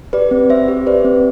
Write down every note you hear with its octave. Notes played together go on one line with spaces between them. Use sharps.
G4 B4 D5
C4
C4 C5 E5
G4
G4 B4 D5
C4